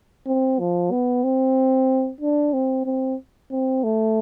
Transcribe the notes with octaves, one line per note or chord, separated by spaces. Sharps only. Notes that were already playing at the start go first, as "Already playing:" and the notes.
C4
F3
B3
C4
D4
C4
C4
C4
A3